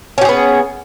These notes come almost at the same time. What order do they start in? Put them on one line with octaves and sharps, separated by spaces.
C#4 G4 G#4 B3